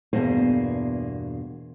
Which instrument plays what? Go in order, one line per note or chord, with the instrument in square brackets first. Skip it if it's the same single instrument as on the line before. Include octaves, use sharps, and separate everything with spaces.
[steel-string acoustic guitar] E2 G2 B2 A#3 G#4 C5